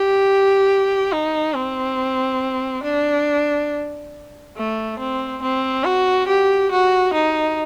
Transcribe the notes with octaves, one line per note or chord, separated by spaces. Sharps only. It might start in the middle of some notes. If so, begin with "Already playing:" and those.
Already playing: G4
D#4
C4
D4
A3
C4
C4
F#4
G4
F#4
D#4